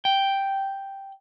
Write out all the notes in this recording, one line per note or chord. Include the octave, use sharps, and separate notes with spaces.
G5